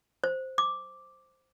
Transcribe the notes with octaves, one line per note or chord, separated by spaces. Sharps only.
C5
D6